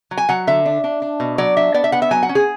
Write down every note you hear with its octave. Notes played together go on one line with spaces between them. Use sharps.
F#3
G#5
F#3 F#5
D3 E5
D4
D4
D4
B2
F#3 D5
D4 E5
B3 D5
E5
B3 F#5
E5
F#3 G#5
F#5
C#4
G#4